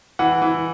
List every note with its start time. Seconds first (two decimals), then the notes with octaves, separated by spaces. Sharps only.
0.19 E3 F#5
0.42 E3